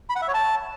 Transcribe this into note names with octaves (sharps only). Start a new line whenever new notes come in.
B5
F#5
E5
C#5
A5